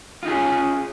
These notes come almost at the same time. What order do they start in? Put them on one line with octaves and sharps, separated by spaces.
F4 D#4 G#4 C#4